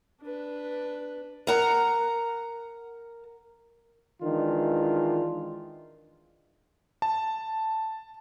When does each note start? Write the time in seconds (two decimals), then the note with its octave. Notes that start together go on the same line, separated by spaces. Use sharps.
0.22 D4 B4
1.47 A#4 F#5 A#5
4.23 D#3 E3 G#3 D4 F4
7.02 A5